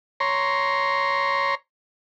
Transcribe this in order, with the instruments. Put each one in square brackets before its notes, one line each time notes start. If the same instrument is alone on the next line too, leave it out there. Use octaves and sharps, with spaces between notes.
[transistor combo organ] C#5 A#5 C6